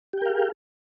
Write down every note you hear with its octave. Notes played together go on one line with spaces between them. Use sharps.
G4 G#4 A#4 F5 G5